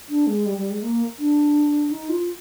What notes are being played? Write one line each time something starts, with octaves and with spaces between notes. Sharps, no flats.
D4
G#3
G3
G3
G#3
A#3
D4
D#4
F4